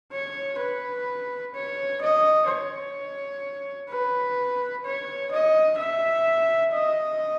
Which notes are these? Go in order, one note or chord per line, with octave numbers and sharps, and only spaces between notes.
C#5
B4
C#5
D#5
C#5
B4
C#5
D#5
E5
D#5